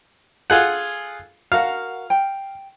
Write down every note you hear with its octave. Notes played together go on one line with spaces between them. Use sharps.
F4 G#4 A4 F#5 G#5
F#4 A#4 F5 F#5
G5